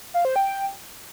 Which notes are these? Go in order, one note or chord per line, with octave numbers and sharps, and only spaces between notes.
F5
C5
G5